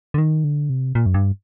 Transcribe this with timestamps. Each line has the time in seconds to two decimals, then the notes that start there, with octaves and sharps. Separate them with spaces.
0.14 D3
0.18 D#3
0.44 D3
0.70 C3
0.95 A#2
1.06 F#2
1.14 G2